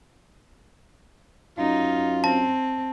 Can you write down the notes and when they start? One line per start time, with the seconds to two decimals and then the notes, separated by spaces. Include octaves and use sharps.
1.59 F#2 D#4 F4
2.24 C4 A5